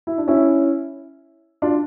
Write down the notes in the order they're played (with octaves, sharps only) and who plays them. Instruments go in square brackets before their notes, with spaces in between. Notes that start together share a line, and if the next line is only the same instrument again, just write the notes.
[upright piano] E4
D4
C#4 E4
D4 F4